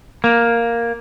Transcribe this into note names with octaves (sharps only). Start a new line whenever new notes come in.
A#3